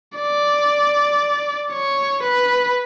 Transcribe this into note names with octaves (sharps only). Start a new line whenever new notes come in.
D5
C#5
B4